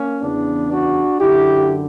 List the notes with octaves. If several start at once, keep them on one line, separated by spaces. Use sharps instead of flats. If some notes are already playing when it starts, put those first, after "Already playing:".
Already playing: A#3 C#4
E2 C#3 E3 B3 D4
D4 F#4
F#2 D3 E4 G4